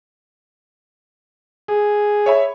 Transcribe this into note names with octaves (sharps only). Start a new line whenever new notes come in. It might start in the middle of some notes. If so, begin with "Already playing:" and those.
G#4
C#5 E5 B5